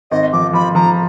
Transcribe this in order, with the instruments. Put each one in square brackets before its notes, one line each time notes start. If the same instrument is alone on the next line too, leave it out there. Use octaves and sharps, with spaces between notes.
[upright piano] G#1 [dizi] D#5
[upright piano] F3 [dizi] D6
[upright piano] F3 [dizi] B5
[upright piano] F3 [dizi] A#5